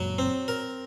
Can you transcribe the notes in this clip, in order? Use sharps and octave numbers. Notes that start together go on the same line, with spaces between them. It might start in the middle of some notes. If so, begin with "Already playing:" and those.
Already playing: F#2 A#2 F#3
C4
A#4